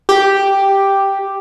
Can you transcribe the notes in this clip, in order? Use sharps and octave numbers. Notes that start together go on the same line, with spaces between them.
G4